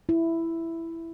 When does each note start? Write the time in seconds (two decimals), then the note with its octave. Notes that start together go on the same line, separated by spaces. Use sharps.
0.09 E4